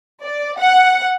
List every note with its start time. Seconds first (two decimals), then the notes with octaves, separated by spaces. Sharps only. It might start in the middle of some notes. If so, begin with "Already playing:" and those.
0.23 D5
0.58 F#5